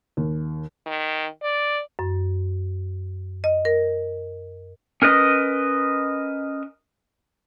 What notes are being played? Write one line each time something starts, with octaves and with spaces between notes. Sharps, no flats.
D#2
D#3
D5
F#2
D#5
A#4
C#4 A#4 B4 D#5